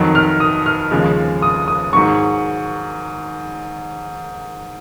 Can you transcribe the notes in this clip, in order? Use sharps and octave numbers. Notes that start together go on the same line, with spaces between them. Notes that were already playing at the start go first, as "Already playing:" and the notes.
Already playing: F2 D#3 F#3
F6
D#6
F6
D#2 C#3 F3 G#3
D#6
D#6
G#2 D#3 F#3 C#6